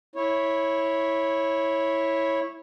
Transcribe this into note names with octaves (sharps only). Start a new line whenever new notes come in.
E4 C#5